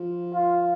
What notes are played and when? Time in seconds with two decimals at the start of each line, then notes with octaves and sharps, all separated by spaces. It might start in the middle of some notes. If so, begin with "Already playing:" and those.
Already playing: F3
0.35 F4